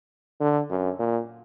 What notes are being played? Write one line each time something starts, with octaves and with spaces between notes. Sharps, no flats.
D3
F#2
A#2